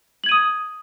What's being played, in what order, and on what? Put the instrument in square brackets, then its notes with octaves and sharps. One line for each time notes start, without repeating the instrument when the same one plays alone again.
[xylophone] F#7
G#6
D#7
D#6